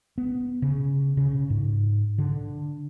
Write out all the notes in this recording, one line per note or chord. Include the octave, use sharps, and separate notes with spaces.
B3
C#3
C#3
G#2
D3